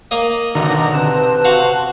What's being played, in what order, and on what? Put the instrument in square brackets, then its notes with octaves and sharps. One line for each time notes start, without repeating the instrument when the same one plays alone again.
[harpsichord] A#3 D#5
[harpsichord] B1 [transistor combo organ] D3 D#3 A#5
[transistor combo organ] C3 [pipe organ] B4 A5
[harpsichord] F#4 F5